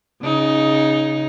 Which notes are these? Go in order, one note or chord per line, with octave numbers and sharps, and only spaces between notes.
C#3 D#4